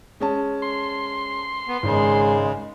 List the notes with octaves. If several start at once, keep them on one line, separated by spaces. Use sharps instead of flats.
G#3 C#4 A5
C6
B3
G#1 C#3 G#3